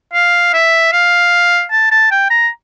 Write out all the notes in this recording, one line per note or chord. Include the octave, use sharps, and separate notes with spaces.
F5
E5
F5
A5
A5
G5
A#5